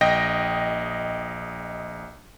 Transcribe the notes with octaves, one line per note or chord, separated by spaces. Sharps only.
A#1 D#5 G5 A#6